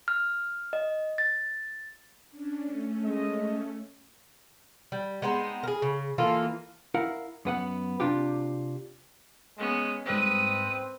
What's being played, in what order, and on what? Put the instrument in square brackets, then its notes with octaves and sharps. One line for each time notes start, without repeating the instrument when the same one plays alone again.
[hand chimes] F6
D#5
A6
[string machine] C#4 D4
A3 C#4
[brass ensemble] G#3 D#5
[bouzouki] G3
G#3 B3 C4 D#4
G#4 A#4
C#3
E3 A#3 F4 A4
[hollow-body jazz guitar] E4 A#4 F5 F#5
F#2 B3 F#5
C3 D4 F4 G4
[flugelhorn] G#3 [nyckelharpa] B3 C#4
[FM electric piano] G#2 G3 D#5 [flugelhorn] C4 [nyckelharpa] B4 D#6